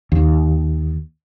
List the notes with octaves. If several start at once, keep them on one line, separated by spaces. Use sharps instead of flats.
D#2